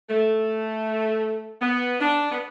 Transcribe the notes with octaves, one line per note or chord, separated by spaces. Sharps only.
A3
B3
D4
B3